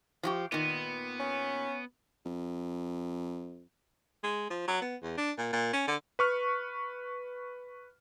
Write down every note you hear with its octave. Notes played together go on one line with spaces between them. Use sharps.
F3 F#4 G4
A#2 D#3 B3
C#4
F2
G#3
F3
F#3
B3
E2
D4
A#2
A#2
C#4
D3
B4 C#6 F6